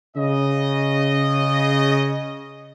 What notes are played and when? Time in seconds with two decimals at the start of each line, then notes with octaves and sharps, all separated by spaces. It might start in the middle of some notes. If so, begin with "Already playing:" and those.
0.17 C#3 D#5